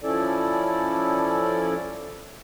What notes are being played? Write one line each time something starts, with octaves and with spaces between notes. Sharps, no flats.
F3 C#4 E4 A4 D5